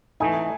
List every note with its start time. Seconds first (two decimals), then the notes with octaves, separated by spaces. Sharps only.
0.20 E3 A3 D#4 G#5